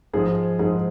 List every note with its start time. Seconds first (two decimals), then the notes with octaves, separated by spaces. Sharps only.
0.13 G#2 F3 G#3 G#4
0.59 G#2 F3 G#3 G#4